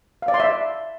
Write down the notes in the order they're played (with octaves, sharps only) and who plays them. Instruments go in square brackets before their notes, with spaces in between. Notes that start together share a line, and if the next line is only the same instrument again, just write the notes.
[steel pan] F5
D5
C6
E5